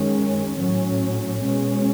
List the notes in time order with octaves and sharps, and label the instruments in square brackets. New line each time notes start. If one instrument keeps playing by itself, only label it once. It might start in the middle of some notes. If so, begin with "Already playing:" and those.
Already playing: [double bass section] F#2 D#3 G#3 C#4
A2 F#3 C#4
B2 G#3 C#4